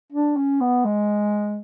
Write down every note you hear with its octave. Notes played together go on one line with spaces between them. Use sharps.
D4
C#4
B3
G#3